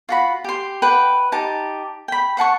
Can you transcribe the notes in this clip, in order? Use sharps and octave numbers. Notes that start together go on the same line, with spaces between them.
F4 F#4 B5
G4 C6
B4 F#5 G5
D#4 G4 A5
G5 B5
C5 F#5 A5 C#6